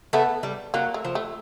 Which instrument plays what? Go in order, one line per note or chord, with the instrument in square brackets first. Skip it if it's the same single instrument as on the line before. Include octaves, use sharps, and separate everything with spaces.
[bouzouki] A3 [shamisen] B3
[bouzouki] G3
[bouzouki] F#3 [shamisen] A#3
[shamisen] A3
[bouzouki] F3
[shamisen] A3